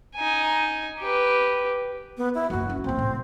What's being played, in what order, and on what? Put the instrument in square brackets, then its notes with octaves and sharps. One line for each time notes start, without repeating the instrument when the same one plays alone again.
[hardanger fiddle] D#4 G#5
G4 B4
[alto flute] B3
E4
[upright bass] F#1 F#2 [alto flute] F#4
[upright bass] C#4
[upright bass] D#1 F#3 [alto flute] C4
[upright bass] A2